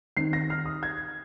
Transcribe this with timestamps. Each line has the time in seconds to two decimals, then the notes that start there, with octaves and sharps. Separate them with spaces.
0.16 D#3 C4 C7
0.33 A#6
0.50 F6
0.66 D#6
0.83 G#6